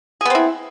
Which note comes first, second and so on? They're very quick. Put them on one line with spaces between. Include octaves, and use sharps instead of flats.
G#4 B3 C4 E4